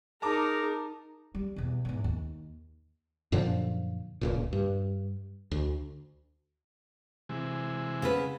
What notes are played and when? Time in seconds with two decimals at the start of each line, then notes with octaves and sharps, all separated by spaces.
0.22 D#4 G#4 A#4 A5 A#5 D6
1.35 G3
1.56 E2 B2
1.85 E2 G#2
2.04 D#2
3.32 F#2 A#2 D3 F3
4.21 D#1 C#2 A#2
4.53 G2
5.51 D2
7.29 C3 E3 G#3
8.02 C#3 B3 B4